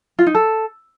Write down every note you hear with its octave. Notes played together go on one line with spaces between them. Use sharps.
F4
D#4
A4